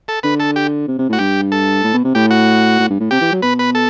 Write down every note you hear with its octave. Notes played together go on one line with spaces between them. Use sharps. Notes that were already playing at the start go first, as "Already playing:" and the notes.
A4
D3 B4
A4
G4
C3
C3
A2 F#4
G2 G4
A4
A2
B2
C3
A2 G4
F#4
A2
G2
A2
C3 G4
E3
F#3
B2 B4
B4
A4